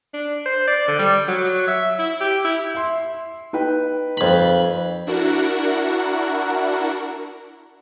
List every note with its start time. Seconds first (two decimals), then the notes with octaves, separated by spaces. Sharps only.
0.14 D4
0.46 C5
0.67 D5
0.88 D3
0.99 G3
1.28 F#3
1.68 E5
1.99 E4
2.21 G4
2.45 E4
2.75 E5 C6
3.53 D#4 B4 G5
4.17 F2 B5
5.07 D4 E4 F#4 A#4 F#5